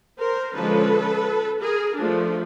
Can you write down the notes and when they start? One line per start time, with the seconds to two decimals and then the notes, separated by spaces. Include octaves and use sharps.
0.19 A#4 C5
0.55 D3 F3 G#3 C#4 A4 B4
1.61 G#4 A#4
1.96 F3 A3 D4